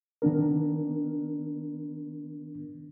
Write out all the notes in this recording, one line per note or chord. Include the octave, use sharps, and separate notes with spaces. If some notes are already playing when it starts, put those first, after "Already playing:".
D#3 B3 D4 A#4